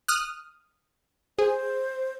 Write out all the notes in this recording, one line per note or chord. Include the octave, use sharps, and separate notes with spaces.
D#6 F6 F#6
G#4 C5